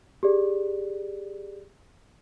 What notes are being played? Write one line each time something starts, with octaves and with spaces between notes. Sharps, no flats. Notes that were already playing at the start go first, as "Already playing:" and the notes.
G4 G#4 D5